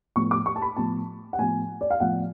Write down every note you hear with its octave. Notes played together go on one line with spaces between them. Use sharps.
A2 F3 B3 C#6
D6
C#6
A5
B5
A2 F3 B3 A5
F#5
A2 F3 B3 G#5
D5
F5
A2 F3 B3 F#5